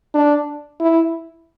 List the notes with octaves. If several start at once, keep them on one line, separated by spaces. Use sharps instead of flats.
D4
E4